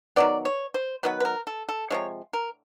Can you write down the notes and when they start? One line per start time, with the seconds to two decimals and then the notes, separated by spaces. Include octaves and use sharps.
0.16 D#3 F#3 B3 D5
0.45 C#5
0.74 C5
1.03 D#3 F#3 B3 B4
1.20 B4
1.25 A#4
1.47 A4
1.69 A4
1.90 C3 F3 G#3 C#5
2.33 A#4